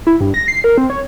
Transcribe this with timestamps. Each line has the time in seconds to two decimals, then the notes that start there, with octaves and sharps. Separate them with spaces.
0.07 E4
0.21 G2
0.34 A#6
0.48 C7
0.64 A#4
0.78 C4
0.90 C#5